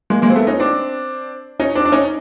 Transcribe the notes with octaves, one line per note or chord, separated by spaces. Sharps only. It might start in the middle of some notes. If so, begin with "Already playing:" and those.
G#3 A#3
G#3 A#3
C4
A3 B3
C#4 D#4
C4 D4
C#4 D#4
C4 D4
D4
C#4 D#4